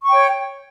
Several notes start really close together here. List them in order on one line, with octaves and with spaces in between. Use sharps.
C#6 G5 C#5